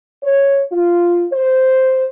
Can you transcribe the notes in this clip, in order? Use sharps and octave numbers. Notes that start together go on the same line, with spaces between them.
C#5
F4
C5